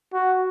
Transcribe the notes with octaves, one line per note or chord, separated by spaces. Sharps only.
F#4